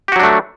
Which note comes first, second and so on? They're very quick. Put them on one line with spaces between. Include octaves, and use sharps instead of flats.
G4 F#4 F#3 D4 A3